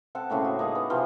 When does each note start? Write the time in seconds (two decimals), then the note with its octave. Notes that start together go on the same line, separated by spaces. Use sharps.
0.15 C4 A4 F#5
0.30 A2 C#3 A3 A#3
0.45 F#4
0.59 A#3 D#4 G#4
0.75 B3
0.90 C3 E3 F3 F5